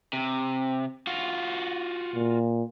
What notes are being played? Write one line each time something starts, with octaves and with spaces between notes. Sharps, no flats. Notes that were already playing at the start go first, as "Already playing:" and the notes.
C3
F4 F#4
A#2